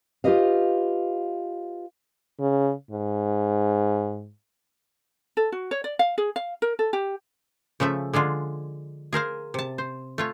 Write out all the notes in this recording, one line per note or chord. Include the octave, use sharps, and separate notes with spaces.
F4 G4 A#4 B4 D#5 F5
C#3
G#2
A4
F#4
C#5
D5
F5
G#4
F5
A#4
A4
G4
C#3 F3 A3 E5
D3 G#3 D4 F4
G#4 A#4 C5 F5
C3 A5
C5
A3 F4 C#5